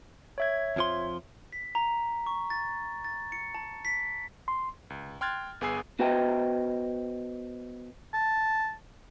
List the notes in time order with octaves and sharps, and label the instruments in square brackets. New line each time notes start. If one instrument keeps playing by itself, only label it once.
[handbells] C#5 E5 G#6
[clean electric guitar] F2 F3 C6
[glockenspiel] B6
A#5
C#6
A6
A6
C#7
A5
B6
[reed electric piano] C6
[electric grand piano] C#2
G5 C6 F6 F#6 G#6 A6
G1 B3 G#4 G#5 E6 C7
[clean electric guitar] B3 F#4 B4 C5 D#5 G5
[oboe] A5